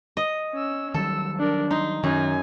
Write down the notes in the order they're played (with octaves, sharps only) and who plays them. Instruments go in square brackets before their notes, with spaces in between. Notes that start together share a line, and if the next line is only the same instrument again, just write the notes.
[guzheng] D#5
[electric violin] C#4 E6
[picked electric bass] D#3 F#3 G3 [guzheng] A4 [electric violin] E6
[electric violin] D4 A#4
[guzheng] D#4 [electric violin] C6
[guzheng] F#2 D#4 [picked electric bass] D#3 [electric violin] G#5